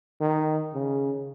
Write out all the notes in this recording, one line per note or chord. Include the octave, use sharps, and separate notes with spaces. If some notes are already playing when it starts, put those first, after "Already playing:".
D#3
C#3